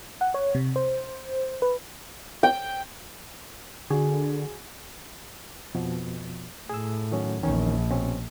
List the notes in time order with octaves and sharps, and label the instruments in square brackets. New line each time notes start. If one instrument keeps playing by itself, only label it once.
[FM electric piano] F#5
C#5
C3
C5
B4
[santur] G5
[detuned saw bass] D3 [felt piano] F#4 G#4 G#5
[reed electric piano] F2 B2 F3
[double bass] A2 [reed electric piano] G#4 E6
[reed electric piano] D#3 F#3 C#4
[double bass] A#1 [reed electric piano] E2 D#3 C#4
[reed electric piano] B2 C4 C#4